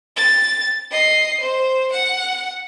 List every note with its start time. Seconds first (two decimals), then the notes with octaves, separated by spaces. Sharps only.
0.17 A6
0.91 D#5 C7
1.40 C5
1.92 F#5